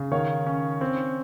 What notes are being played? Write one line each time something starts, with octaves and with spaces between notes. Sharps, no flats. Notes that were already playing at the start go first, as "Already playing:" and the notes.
Already playing: C#3
D#3 C#5 F5
C#4
C4